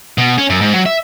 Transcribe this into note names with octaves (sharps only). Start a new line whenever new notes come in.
B2
C#4
F#2
G#2
F#3
E5